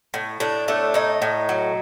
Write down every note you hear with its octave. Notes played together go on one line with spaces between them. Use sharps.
A2
A2 D4
A3 D4
A2 D#4
A2
F#3